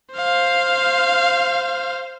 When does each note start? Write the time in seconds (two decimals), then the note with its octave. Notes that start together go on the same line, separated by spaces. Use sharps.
0.15 C5 F5